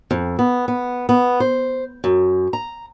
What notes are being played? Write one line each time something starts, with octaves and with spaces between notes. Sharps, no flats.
F2
B3
B3
B3
C5
F#2
A#5